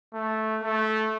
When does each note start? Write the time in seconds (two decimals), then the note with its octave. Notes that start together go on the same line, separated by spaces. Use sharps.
0.14 A3
0.63 A3